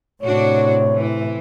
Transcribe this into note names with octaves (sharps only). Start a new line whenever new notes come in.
A2 C3 D4 F#4 C#5
E3